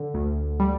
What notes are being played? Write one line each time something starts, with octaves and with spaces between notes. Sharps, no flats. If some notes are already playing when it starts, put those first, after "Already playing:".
Already playing: D3
D2
G3